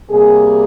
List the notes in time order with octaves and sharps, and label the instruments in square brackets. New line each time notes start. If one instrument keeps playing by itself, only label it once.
[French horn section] C3 G3 A#3 G#4